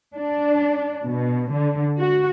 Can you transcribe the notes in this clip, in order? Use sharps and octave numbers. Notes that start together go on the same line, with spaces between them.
D4
B2
D3
F#4